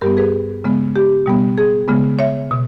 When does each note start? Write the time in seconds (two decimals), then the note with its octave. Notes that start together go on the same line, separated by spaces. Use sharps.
0.01 G2 G3 B3 G4 A#4
0.17 G#4 B4
0.64 C#3 G#3 B3
0.96 G4
1.26 B2 G3 B3
1.58 G#4
1.88 C#3 G#3 B3
2.19 C#5 E5
2.51 B2